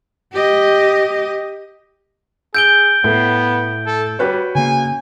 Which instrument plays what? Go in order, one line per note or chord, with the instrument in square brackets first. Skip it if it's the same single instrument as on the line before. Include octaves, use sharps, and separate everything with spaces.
[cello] G4 D#5
[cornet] G#4 [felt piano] E6 [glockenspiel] G6 D7 G7
[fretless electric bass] A2 [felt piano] A3 [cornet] B3
[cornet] A4
[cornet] G3 [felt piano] F#4 B4 C#5
[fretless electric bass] C#3 A#3 [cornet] G#5